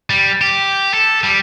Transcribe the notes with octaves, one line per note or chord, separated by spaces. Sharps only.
G3
G4
A4
G3